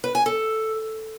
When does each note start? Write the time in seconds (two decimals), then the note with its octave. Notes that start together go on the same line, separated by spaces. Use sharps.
0.04 B4
0.15 G#5
0.26 A4